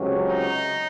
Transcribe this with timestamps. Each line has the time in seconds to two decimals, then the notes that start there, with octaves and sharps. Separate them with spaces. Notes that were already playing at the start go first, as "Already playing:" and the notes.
Already playing: C#2 C3 F#3 C#4
0.25 D#4